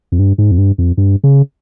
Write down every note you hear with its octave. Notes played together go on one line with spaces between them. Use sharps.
F2
G2
G#2
F2
G2
F2
G2
C#3